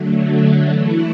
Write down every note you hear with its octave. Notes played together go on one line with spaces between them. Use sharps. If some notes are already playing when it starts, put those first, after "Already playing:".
Already playing: D3 F#3 A3
E3 A3 E4